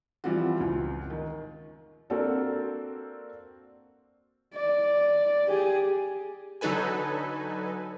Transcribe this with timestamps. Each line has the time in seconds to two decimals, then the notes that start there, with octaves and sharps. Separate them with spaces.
0.24 E3 F3 G3 C4 F4 F#4
0.60 C#2
1.10 D#3
2.10 A#3 C4 D4 F#4 A4
4.54 D5
5.47 G4 G#4
6.61 D3 F#3 D#4 A4 B4 G#5